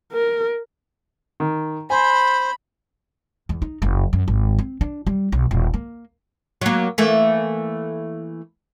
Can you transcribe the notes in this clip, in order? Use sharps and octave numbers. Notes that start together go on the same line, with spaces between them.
A#4
D#3
C5 G#5 B5
E2
D#4
F#1
F#2
G#1
C4
D4
G3
B1
D#1
A#3
F#3 A#3
E3 A3 A#3